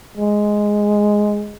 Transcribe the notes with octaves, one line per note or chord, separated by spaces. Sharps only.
G#3